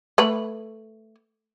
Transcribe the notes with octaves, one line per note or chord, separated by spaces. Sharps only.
A3 B4 B5